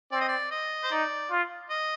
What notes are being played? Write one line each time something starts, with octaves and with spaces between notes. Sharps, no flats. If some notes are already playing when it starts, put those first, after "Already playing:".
C4 D5
D#5
D5
D#5
C5
D#4 D5
F4
D#5